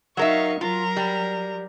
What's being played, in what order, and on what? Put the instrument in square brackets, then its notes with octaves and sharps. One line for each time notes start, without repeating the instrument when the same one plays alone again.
[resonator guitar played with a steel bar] F#3 A#4 E5 [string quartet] D#4 F5 C#6
[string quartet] F#3 A#4 [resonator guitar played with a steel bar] F4
[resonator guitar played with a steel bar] G3